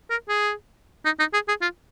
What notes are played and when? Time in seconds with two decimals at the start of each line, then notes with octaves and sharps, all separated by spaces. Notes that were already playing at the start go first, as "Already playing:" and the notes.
0.10 A#4
0.29 G#4
1.05 D#4
1.19 D#4
1.33 G#4
1.48 G#4
1.62 F4